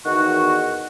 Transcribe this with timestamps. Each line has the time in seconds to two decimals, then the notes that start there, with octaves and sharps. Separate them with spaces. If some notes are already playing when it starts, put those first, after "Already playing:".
0.04 E2 D#3 F#4 F#5 C#6